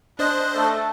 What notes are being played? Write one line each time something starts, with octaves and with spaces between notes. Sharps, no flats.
D4 C5 D#5 F#6
A3 A4